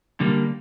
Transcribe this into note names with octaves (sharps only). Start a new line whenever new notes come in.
D3 G3 A#3